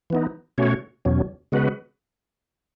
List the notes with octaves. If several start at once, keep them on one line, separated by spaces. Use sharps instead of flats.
E3 B3 D#4
B2 A3 C#4 F#4 C#5
E2 B2 F#3 C#4
C#3 G#3 B3 F#4 B4